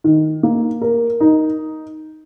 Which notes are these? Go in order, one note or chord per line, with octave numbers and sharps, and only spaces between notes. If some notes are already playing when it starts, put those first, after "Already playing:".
D#3
A#3
A#4
D#4